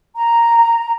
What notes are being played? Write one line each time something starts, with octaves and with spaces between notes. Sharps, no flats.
A#5